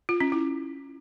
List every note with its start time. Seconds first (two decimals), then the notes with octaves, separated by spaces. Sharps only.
0.09 F4
0.20 C#4
0.32 E4